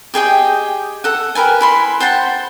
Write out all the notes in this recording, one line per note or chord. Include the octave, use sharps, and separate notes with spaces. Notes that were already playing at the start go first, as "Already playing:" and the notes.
G4 G#4 D#5 G5
A4 F#5
G4 A#4 B4 G#5
E4 B5 C6
C5 F#5 G5 A5